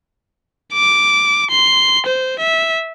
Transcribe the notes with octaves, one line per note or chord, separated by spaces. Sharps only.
D6
C6
C5
E5